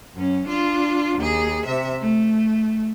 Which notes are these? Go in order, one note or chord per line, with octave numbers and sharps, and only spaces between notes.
F#2 C#4
D4 F4
D#2 G#4
C3 E5
A3